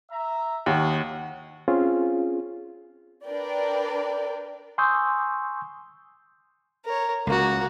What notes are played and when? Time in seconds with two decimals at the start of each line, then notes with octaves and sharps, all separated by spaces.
0.10 E5 A#5
0.66 D#2 C#5 D#5 F#5
1.68 C4 C#4 F4 G#4
3.28 D4 A#4 B4 D5 G5
4.78 G#5 C6 C#6 D#6 E6 G6
6.85 A#4 C#5
7.27 C#2 A#3 F#4